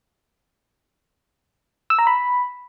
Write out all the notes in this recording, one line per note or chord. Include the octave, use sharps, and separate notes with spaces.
E6
A#5
B5